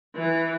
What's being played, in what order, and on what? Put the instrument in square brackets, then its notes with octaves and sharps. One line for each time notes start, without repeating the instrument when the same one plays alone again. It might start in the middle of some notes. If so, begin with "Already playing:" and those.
[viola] E3